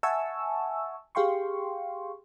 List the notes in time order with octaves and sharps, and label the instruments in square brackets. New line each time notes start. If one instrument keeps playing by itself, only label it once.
[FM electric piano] E5 F#5 G#5 A5 C#6 E6
G4 G#4 F5 G5 C6 C#6